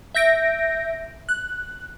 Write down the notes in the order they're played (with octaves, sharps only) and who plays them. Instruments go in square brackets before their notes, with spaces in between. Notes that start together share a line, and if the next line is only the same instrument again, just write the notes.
[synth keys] E5 G6 A#6 D7
F#6